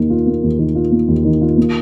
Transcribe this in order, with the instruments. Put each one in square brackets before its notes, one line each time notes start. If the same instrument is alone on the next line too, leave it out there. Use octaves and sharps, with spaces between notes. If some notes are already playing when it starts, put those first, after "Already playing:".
Already playing: [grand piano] D#2 D#3 A#3
F4
A#3
D#2
D#3
F4
A#3
D#2
D#3
F4
A#3